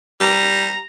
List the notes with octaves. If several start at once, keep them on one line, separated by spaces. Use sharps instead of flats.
G3 A#5